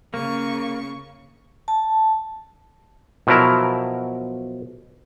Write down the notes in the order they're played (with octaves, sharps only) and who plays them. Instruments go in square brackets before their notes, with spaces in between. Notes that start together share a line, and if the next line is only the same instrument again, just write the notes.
[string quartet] C#3 C#6 [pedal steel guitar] A#3
[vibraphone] A5
[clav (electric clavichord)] B2 F3 F#3 E4 A#4